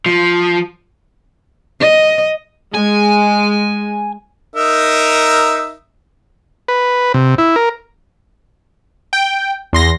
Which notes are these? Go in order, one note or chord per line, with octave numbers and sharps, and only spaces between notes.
F3
D#5
G#3 G#5
D#4 A#4 E5
B4
C3
E4
A#4
G5
E2 C6 A#6